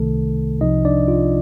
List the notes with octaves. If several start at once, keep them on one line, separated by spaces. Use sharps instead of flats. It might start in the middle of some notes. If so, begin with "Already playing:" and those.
Already playing: C2 C3 D#3 A3 A4
C2 C3 F3 D#4 D#5
D4 D5
F4